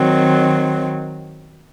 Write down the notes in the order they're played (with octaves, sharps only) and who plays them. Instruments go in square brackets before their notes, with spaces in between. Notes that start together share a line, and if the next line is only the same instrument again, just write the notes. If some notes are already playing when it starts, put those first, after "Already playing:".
Already playing: [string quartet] D#3 F#3 C4